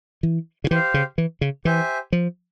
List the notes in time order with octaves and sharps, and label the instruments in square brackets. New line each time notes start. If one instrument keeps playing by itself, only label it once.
[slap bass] E3
C#3
[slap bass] E3 [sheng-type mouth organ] G4 C5 F5
[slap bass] C#3
E3
C#3
[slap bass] E3 [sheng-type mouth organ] G4 C5 E5 G#5
[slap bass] F3